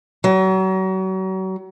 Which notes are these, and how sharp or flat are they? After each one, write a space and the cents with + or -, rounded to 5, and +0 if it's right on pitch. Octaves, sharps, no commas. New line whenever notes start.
F#3 +35